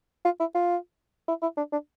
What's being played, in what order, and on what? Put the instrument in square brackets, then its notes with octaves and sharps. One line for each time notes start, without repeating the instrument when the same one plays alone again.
[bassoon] F4
E4
F4
E4
E4
D4
D4